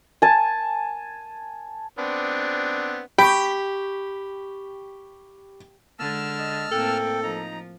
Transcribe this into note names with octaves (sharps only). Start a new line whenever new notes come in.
G#5 A5
B3 C4 D4
G4 G5 B5 C#6
D3 G#3 A5 E6 F6
D#5
A2 A#3 C4 A4 G5
F3 D#4 A#5